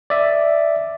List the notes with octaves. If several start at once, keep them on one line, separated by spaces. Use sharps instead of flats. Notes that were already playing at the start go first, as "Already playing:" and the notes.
D5 E5